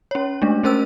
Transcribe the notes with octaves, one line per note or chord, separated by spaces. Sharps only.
C#4 C#5
G#3 A3 D4
A3 C#4 A#4 C5 E6